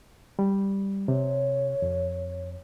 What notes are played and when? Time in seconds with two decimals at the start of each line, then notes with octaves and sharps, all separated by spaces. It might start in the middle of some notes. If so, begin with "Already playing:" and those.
0.39 G3
1.08 C3 C#5
1.82 F2